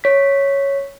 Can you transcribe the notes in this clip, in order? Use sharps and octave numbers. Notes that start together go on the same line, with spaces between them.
C#5 B6